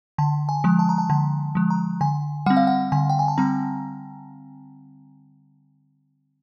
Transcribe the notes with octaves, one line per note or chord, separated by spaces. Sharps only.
D3 A5
G#5
F3 G#3
A5
A#5
A5
D3 A5
F3 G#3
A#5
D3 G#5
G3 C4 F#5
F5
F#5
D3 G#5
G5
G#5
A5
G3 C4 A#5